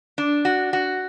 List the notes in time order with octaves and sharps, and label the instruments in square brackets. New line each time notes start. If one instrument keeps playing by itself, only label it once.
[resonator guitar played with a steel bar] D4
F#4
F#4